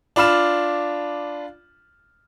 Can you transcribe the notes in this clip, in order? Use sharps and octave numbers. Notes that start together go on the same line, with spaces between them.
D4 F4 B5 F6 E7